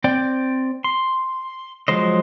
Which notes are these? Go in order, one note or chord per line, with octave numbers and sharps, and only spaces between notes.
C4 D5 G5
C6
F3 F#3 G#3 C5 D#5